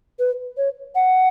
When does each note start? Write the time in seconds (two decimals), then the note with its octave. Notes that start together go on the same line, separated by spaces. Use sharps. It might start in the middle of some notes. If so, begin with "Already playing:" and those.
0.18 B4
0.57 C#5
0.95 F#5